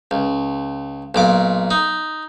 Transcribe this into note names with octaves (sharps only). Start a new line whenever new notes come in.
C#2
B1 A#2 D6
D#4